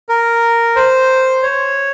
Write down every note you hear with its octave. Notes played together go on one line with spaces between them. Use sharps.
A#4
C5
C#5